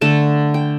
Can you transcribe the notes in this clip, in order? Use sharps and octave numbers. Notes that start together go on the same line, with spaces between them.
D3 A3 A5
G5